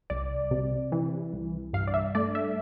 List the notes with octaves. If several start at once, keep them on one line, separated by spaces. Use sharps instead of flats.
C2 D5
C3
E3
C2
G2 F5
D5
E5
A3 D5
E5